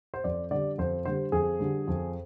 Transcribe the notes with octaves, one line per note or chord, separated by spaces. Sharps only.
C5
F2 D5
D3 G3 D5
F2 C5
D3 G3 C5
F2 G#4
D3 G3
F2